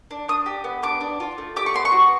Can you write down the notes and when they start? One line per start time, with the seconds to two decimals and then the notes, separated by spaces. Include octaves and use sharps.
0.11 D4
0.28 D4 D#6
0.46 G4
0.64 B3
0.82 D4 D6
1.01 D4
1.20 F4
1.38 A3
1.56 G4 D6
1.66 C#6
1.74 B3 C6
1.85 C#6
1.92 F#4